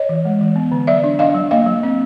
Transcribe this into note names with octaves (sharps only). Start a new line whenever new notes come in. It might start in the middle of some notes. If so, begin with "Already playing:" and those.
Already playing: C#5 D#5
E3
G#3
E3
B3
D3
F#3 D5 E5
D4
D4 D#5 F5
F#3
A#3 D#5 F5
F#3
C4